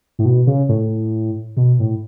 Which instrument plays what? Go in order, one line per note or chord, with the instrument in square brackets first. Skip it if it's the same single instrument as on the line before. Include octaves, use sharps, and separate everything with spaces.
[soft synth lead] A2
B2
C#3
A2
B2
A2